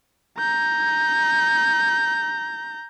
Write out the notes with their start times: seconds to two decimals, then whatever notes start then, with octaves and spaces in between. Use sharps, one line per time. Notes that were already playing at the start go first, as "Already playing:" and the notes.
0.38 A#5 G6